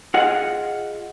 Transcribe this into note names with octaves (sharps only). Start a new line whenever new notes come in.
F4 G#4 D#5 F#5